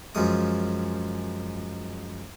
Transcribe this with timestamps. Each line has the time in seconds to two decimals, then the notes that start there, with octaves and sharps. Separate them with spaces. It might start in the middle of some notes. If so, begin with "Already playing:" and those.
0.15 F#2 F3 G#3 D#6